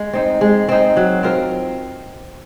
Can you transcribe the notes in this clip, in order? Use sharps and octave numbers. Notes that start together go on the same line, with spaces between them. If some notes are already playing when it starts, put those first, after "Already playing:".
Already playing: G#3
C4 D#4
G#3
C4 D#4
F#3
C4 F4 A#4